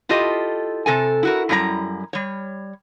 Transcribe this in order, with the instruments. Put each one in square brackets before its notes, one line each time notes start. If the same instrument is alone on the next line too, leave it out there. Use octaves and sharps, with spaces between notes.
[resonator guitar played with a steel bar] E4 F4 G4 A4 D#5
C3 A4 G#5
E4 F#4 A#4
F#2 G3 E4 F4 A#5
G3 C#5